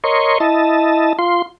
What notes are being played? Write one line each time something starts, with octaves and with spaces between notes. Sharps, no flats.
A#4 C#5 D#5 C6 C#6
E4 D#5 A5
F4 C6